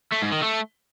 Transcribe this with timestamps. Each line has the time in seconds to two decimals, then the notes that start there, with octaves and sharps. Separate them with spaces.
0.12 A3
0.22 G#2
0.32 D#3
0.42 A3